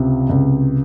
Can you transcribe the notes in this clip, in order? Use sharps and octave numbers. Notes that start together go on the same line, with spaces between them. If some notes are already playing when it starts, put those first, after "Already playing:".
Already playing: C#2 C3
C#2